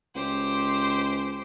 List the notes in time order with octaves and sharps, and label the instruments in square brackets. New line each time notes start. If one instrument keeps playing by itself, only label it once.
[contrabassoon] C#2 [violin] G4 C5